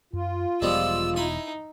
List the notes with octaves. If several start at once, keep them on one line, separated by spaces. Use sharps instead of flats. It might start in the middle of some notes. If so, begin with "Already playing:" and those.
F#2 F4
E1 F3 G3 G#3 B3 E6
D#4 E4 G#5